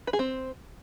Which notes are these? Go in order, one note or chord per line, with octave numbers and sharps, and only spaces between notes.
B4
G#4
C4